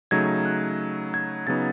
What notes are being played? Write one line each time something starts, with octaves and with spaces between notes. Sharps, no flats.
C#3 F#3 A3 D#4 G#6
F#6
G#6
C#3 F#3 B3 D#4 A6